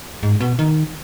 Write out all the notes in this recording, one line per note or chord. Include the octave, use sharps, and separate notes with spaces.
G#2
B2
D#3